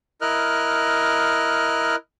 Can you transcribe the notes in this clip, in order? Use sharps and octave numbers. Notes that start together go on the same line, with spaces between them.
E4 A#4 D#5 F6 F#6